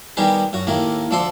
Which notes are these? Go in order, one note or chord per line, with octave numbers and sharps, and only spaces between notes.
B2 D#3 G3 B3 G4 G#4
F#2 F#4
D#2 A2 D#3 A#3
D2 F3 A4 D5 C6